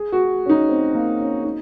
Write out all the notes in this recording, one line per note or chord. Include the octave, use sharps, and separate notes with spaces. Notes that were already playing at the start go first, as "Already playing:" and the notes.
Already playing: G#4
F#4
C#4
D#4
C4
A#3
C#4
D#4